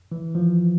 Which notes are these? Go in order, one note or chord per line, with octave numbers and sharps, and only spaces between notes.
E3
F3